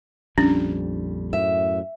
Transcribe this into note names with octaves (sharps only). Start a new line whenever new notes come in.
A#1 F2 G3 C#4 D4
F#2 A2 E5